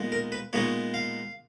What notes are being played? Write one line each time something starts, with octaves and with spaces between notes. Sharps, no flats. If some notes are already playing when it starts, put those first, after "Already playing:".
Already playing: A#2 G#3 B3 D#4
A#4
B4
A#2 G#3 B3 D#4 C#5
F5